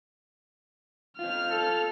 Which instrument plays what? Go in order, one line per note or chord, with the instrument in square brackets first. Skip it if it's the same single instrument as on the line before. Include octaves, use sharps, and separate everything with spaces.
[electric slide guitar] C4 F4 [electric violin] F6
[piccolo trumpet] A4